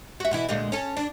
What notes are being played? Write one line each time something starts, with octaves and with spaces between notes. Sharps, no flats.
F#4 E5
B2 E3 E4
D2 A#2 G#3
C#4 A4
D4